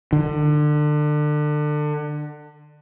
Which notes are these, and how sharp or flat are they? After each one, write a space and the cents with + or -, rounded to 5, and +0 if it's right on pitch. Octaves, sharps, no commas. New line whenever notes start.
D3 +30